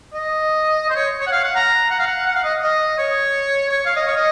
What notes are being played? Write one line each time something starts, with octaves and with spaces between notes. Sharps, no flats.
D#5
C5
C#5
C#5
F#5
F5
F#5
A#5
F#5
F5
F#5
F#5
F5
D#5
D#5
C#5
C#5
F5
D#5
C#5
D#5